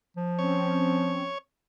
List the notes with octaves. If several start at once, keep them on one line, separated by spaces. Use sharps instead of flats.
F3
C4 C#4 C#5